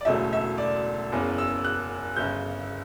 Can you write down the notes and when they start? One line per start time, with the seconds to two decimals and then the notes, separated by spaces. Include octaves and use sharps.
0.01 D5
0.05 E1 D2 C#3 F#3 A3 E5
0.33 E5
0.58 D5
1.12 F#1 E2 C#3
1.38 E6
1.65 F#6
2.16 G1 C#3 G6